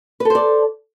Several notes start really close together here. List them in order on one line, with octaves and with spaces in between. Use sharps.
B4 A4 C5 D5